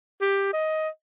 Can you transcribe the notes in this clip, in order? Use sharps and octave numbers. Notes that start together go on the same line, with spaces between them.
G4
D#5